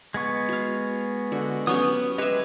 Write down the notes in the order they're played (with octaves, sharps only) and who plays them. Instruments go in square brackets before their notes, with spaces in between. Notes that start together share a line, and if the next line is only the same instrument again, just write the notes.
[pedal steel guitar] G#3 B3 C#6
[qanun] F#4 F5
[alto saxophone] D3 [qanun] F#4
[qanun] F#3 C#4 G4 [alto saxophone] B3 [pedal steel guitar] C#6 D#6
[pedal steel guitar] G#3 G4 D#5 [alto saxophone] B4 [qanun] C#5 E5